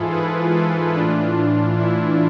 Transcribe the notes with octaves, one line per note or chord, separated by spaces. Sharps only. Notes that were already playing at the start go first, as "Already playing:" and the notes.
Already playing: G#2 E3 E4 F4 G#4 A4
G#4 B4
F4 A4
A2 E3 D4 F4
E4